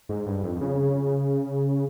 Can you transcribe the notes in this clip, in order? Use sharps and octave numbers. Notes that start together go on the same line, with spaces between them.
G#2
G2
F2
C#3